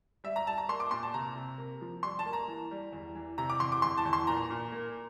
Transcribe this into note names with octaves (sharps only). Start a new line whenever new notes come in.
G3 E5
A#5
G3 A5
A#5
A#3 C6
D6
A#2 C6
A5
C3 A#5
C3
A#3
F3
G3 C6
A5
A#3
A#5
E3
G3
E2
E3
C3 A#5
D6
E2 C6
D6
E2 C6
A5
E2
C6
A#2 A#5
A#2
A#3